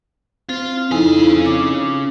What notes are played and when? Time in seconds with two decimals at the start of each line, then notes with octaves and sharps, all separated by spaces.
0.49 C4 F4
0.91 F2 C#3 D#4 E4 G#5
1.46 D6